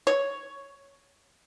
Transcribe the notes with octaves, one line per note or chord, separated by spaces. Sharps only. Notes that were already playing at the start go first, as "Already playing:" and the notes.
C#5